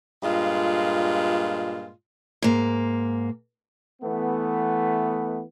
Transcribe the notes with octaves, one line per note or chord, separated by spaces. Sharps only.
G2 A#2 G#3 F4
G#2 A#3
E3 A3 B3